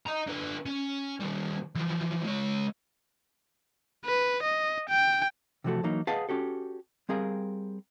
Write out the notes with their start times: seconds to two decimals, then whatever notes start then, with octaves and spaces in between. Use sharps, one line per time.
0.07 D#5 A#5
0.27 D3 B4
0.66 C#4
1.20 D#3 G3
1.75 E3 F3
2.24 G#3 C#5
4.05 B4
4.43 D#5
4.89 G5
5.64 C3 E3 F3 A3 F#4 A4
5.83 E3 F#3 A#3 D#4
6.07 G#4 B4 D#5 F5 F#5 A5
6.29 C#4 F#4 G4 A4
7.09 G3 C4 G#4 A#4 F5